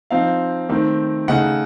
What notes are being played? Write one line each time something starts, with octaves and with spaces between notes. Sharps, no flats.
F3 C4 D#4 F5
D#3 A3 C4 D#4
C#3 A3 D#4 F#5